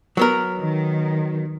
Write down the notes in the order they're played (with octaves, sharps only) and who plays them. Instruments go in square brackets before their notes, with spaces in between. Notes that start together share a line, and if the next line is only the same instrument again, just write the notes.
[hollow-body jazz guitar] F#3 B3 A#4
[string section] D#3